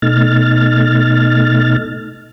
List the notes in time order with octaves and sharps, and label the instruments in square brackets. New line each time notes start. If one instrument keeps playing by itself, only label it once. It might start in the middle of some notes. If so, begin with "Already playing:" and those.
[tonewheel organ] B2 A3 D#4 F6 A6